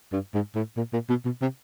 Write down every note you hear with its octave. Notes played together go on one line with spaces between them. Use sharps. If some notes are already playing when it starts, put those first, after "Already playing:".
G2
G#2
A2
A#2
A#2
B2
B2
C3